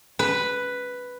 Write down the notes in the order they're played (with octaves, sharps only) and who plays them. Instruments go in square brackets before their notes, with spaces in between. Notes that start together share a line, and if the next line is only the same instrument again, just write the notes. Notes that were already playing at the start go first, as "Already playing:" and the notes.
[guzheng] B4